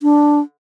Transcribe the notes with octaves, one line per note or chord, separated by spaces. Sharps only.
D4